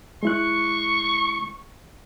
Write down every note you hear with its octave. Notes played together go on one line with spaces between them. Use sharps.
G#3 E4 C#6 F#6